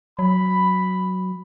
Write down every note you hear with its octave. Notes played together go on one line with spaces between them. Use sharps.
F#3 B5